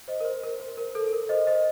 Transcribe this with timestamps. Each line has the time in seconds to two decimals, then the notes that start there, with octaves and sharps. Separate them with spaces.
0.08 C5 D#5
0.20 A#4
0.25 C5
0.43 A#4
0.60 C5
0.77 A#4
0.95 A4
1.13 A#4
1.29 C5 D#5
1.47 C5 D#5